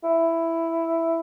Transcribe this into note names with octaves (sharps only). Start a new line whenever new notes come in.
E4